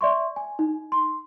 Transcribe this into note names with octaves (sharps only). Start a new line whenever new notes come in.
D5 E5 C6 C#6
G#5
D#4
C6